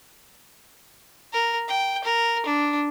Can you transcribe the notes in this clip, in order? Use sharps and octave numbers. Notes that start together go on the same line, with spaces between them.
A#4
G5
A#4
D4